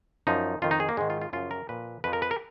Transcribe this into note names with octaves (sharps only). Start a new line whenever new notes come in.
F#2 F3 D#4
F2 D#3 F4
D#4
G#4
A#3
G#2 D#3 G#3
F4
F4
F#2 C#3 F3 F4
A#4
A#2 F3 B4
F2 F3 B4
A#4
B4
A#4